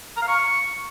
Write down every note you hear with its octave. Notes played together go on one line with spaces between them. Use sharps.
A#5
F5
C#6